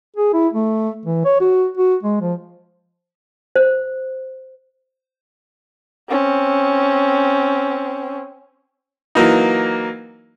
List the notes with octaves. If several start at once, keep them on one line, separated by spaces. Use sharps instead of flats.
G#4
E4
A3
E3
C#5
F#4
F#4
G#3
F3
C5
C4 C#4
E3 F#3 A#3 D#4